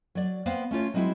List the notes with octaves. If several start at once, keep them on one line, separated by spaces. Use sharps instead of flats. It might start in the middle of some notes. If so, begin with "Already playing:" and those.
F#3 D5
A#3 B3 B4 C5 F5 G5
A3 C#4 F4 C#5
F#3 G#3 C4 E4 F#4